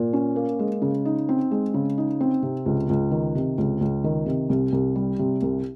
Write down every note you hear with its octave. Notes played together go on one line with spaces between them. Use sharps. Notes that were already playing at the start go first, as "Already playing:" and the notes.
Already playing: A#2
C#4
A#3
G#3
C#3
D#4
C4
G#3
C#3
D#4
C4
C3
C#2
C#2
D#3
C3
C#2
C#2
D#3
C3
C2
C2
G3
C3
C2